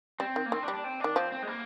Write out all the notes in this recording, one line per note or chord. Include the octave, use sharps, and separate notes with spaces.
G3 C4
D#3
A#3
D#3 C4
D4
G3
D4
C4
D#3 D4
F3 C4
C4
G#3
A#3